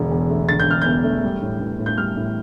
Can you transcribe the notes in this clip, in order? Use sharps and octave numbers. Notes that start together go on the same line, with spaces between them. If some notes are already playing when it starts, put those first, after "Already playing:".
Already playing: E1 D3
E2
A3
D3 A6
G6
E1 F6
E2 G6
A3
G3
A2
E3
A2
G6
G3 F6
A2